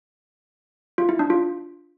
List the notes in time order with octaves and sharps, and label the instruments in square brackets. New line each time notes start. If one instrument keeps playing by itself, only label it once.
[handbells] F4
E4
D4
F4